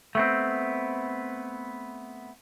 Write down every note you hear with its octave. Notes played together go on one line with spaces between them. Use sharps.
A3 B3 C4